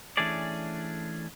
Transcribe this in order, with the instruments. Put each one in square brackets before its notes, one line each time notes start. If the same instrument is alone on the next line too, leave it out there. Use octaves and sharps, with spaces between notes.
[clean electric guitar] E3 A3 C#4 D4 G#4 D5